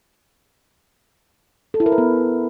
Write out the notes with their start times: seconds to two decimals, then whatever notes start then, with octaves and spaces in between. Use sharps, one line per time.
1.74 A4
1.80 E4
1.86 A#4
1.92 B4
1.98 B3